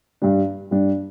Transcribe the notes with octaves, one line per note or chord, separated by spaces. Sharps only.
G2 G3 D4
G2 G3 D4